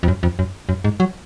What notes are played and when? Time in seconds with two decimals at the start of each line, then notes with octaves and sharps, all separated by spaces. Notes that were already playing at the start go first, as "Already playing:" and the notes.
0.03 F2
0.08 F#2
0.23 F2
0.39 F#2
0.69 F#2
0.84 G#2
1.00 F#3